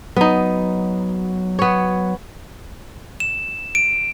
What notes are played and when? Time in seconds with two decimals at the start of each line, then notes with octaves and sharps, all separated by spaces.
0.16 F#3 B3 D#4
1.59 B3 C#5
3.20 E7
3.75 D7